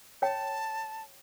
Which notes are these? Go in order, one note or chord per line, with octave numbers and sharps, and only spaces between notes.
C#5 G5 A5